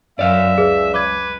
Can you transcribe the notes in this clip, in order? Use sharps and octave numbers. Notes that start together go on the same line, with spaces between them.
F#2 D5 E5 F5
C#2 G#4 B4
B4 D6 G#6